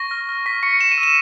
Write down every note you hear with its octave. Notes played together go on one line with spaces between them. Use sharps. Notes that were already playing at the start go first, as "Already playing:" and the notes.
Already playing: C#6 A#6
F6
F6
C#6 B6
C#6 C#7
C#6 E7
D#7
E6
E7